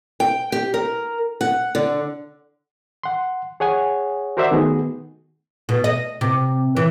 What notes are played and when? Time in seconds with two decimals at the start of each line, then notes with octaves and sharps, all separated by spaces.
0.20 G5
0.52 G4
0.74 A#4
1.41 F#5
1.75 D3
3.03 F#5 C6
3.60 G#4 C#5 F#5 G#5
4.37 F#4 A#4 C5 D5 E5 F#5
4.51 D#3 A3 B3 D#4 F#4 G#4
5.69 B2
5.84 D#5
6.21 C3
6.77 E3